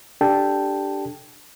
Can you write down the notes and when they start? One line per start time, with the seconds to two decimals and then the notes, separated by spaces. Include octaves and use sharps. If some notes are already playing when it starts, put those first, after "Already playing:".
0.21 D4 G4 A4 G5 A5